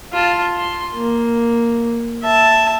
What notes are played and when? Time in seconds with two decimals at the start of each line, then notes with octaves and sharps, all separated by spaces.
0.13 F4 A5
0.59 C6
0.95 A#3
2.23 E5 A5